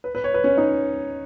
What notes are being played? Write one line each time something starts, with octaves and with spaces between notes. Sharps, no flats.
B4
B4
C#5
B4
C#4
D#4